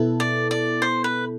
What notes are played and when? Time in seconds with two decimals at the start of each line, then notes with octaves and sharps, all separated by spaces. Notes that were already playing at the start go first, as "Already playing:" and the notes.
Already playing: B2 B3 E4 A4
0.20 D5
0.51 D5
0.82 C5
1.04 B4